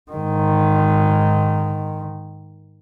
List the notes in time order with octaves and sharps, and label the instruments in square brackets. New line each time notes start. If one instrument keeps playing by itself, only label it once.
[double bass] G#2 D#3